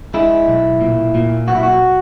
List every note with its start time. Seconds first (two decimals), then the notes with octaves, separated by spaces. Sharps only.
0.14 G#3 E4
0.48 B1
0.81 A#2
1.15 A#2
1.48 B1 F#4
1.55 E4
1.63 F#4